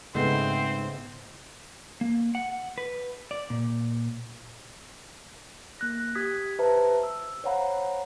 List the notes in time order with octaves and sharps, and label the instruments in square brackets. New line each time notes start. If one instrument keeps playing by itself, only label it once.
[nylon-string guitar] G#2 [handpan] C#3 A3 B3 [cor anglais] C4 [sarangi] C5
[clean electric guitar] A#3
F#5
B4
D5
A#2
[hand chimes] A#3 F#6 A#6
G4 D#6 G#6 B6
G4 B4 C5 E5 A5 A#5
E6
C5 C#5 F5 F#5 A#5 B5